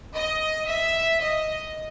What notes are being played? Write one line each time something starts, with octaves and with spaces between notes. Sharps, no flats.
D#5
E5
D#5